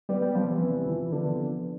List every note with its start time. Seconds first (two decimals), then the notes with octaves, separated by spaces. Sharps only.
0.09 G3 B3
0.22 G3
0.35 C3 F3
0.48 E3
0.61 C3
0.86 F3
1.12 D3 B3